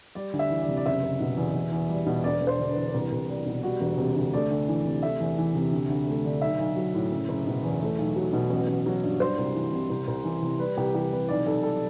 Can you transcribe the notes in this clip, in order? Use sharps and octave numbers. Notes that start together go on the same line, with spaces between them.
G3 D5
D2
E5
E3
D5
C3
D5
F#1 E5
F#1
B2
E2
E2
E2
G3
B2
E1 D5
E1
C5
D3
B4
E2
C2
C2
G3
B2
G3 F#4
E1
C3
D2
A3 D5
D2
E3
C3
A3 E5
E2
E3
C3
D2
D2
A3
D3
B1 E5
B1
F#3
A2
F#1
F#1
B2
E2
A3
B1
F#3
B2
A1
A1
F#3
G2
G3 C5
C2
E3
C3
C2
C2
E3
C3
G3 B4
C2 G4
E3 G4
C3 B4
B1 D5
B1 A4
G3 A4